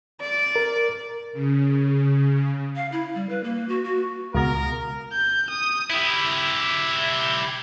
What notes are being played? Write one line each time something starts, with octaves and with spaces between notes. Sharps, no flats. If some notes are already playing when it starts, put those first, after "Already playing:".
D5
A#4
C#3
F5
E4
G3
B4
A#3
F#4
F#4
C#2 B2 A#4
G6
D#6
E4 G4